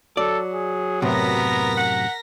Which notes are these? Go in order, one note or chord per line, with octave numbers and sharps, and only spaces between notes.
F#3 A4 D5
G#4
F#2 A2 C3 B3 A#4 A#6 B6
F#5